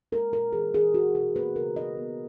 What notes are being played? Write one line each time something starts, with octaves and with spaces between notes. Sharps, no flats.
G#3 A#4
A#2 A#4
E3 G#4
E3 G#4
D#4 F#4
B2 G#4
A#3 B4
C#3 A#4
D#4 D#5
B3